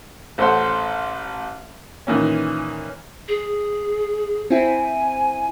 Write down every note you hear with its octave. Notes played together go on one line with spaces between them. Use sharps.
A1 A4 C5 C#5 F#5 C6
A#2 D#3 E3 A#3 C#4
G#4
C4 E4 G#5